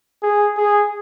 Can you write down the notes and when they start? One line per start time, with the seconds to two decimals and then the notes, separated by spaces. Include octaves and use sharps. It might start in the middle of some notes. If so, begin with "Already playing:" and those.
0.23 G#4
0.57 G#4